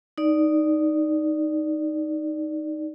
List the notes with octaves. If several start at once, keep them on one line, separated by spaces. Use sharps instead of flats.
D#4 D5